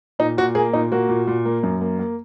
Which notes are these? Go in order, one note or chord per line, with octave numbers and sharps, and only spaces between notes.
A#2 D#4
A#2 F#4
A#3 G#4
A#2 D#4
A#3 F#4
A#2
A#2
A#3
F#2
A#3
A#3